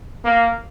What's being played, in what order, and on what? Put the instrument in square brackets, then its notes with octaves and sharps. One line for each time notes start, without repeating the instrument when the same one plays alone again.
[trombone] A#3